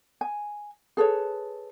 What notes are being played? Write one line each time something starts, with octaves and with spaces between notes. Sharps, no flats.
G#5
G#4 A4 B4 C#5